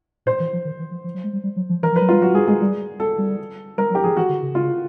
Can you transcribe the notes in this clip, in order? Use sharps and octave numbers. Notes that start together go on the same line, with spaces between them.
A#2 C5
E3
F3
D#3
E3
F3
F3
F#3
G#3
G3
G3
F#3
F3
E3 A#4
F3
B4
F#3
G3 F4
F#3 F#4
G3 G#4
G#3 G#4
G3
A4
G3
G3 A#4
F#3
G4
F3 G#4
E3 F#4
D3
C#3
F4